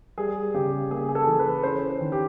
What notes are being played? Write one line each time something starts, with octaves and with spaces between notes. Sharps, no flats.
G3 G#4
C#3 G4
A#3 G#4
G#4
A4
E3
B4
C#4 C5
D#3
G4